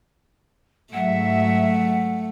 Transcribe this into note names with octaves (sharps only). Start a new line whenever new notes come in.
G#2 F#3 A3 E5 F#5